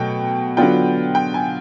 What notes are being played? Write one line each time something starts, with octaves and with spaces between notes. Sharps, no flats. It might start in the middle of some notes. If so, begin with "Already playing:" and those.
Already playing: B2 F#3 A3 G5
D3 F#3 B3 D4 F4 G5
G5
G#5